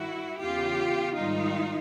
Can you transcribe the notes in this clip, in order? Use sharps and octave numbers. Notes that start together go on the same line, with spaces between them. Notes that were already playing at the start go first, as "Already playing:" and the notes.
Already playing: G2 D#3 G3 E4 F#4
E2 C#3 E3 F4 G4
G#2 D#3 G3 D#4 F4